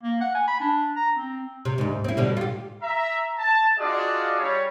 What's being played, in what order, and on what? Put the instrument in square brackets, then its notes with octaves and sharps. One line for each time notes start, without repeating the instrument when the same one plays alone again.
[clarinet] A#3
F#5
G#5
B5
D4
A#5
C4
[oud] C3
D2 G#2
C4 E4
B2 D3 G3
F4 G4
[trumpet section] E5 A#5
A5
D4 F4 F#4 G#4 D5 D#5
G3 C#5